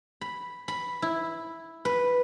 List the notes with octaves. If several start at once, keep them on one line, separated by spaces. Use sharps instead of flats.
B5
B5
E4
B4